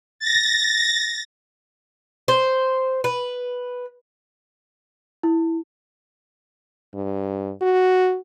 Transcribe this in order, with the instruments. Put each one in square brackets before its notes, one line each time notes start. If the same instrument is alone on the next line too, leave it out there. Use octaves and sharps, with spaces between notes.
[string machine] A6 A#6
[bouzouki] C5
B4
[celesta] E4
[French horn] G2
F#4